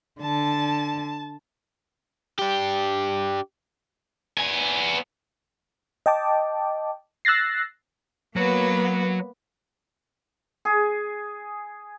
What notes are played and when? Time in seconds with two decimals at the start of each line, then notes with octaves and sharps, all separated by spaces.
0.21 D3 A5
2.39 D4 G4
4.37 B3 G#5
6.06 D#5 G5 A5 D6
7.25 E6 F#6 A6 A#6 C7
8.36 F#3 A#3 B3 B4 C#5
10.65 G#4